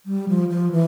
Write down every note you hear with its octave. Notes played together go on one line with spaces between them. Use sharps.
G3
F3
F3
E3